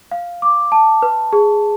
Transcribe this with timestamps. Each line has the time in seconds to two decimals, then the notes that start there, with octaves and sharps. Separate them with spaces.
0.11 F5
0.42 D6
0.72 A5
1.02 B4
1.33 G#4